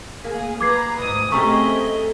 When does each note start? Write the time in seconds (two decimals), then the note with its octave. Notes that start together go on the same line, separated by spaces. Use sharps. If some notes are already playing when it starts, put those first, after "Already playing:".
0.24 A#3 G#4
0.61 B4 A#5 D6 G#6 C7
0.98 D2 G#2 D#6
1.32 A3 C4 C#4 G4 G#4 D#5 A#5 C#6